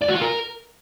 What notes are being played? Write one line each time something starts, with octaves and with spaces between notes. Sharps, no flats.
D5
F#4
F4
A#4